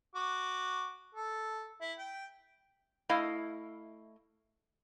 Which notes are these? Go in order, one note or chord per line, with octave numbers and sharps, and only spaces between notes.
F#4 D6
A4
E4
G5
A3 E4 D#5 F5